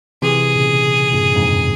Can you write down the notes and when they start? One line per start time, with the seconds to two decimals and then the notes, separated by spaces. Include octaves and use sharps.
0.22 C3 E3 G#4
0.56 A#2 C#3
1.13 G2 A#2
1.35 F2 G#2